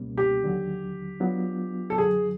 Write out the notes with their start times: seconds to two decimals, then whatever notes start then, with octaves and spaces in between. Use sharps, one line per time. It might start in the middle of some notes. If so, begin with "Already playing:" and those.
Already playing: C#2 B2 G3 A#3 C#4
0.17 G4
0.43 D#2 D3 F#3
1.20 F#3 B3 D4 F4
1.90 A4
1.98 F#2 D3 F#3 G#4